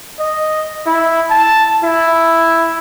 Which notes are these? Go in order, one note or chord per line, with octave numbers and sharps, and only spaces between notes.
D#5
E4
A5
E4